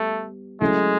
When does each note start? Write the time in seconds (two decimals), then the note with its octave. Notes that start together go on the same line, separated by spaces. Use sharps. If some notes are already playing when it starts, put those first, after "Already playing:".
Already playing: G3 A3 B3
0.61 F#3 G#3 A3 C#4 E4